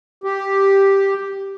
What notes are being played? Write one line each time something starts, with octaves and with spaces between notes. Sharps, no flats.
G4